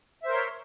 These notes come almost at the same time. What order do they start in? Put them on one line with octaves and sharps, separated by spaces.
E5 C5 A#4 C6 C#5